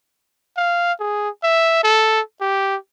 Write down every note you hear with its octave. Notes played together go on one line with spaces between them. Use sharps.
F5
G#4
E5
A4
G4